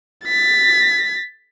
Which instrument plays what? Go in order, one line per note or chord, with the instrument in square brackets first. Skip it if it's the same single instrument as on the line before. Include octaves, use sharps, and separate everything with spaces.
[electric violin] A6 B6